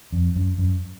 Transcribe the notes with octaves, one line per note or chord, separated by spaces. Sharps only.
F2
F#2
F#2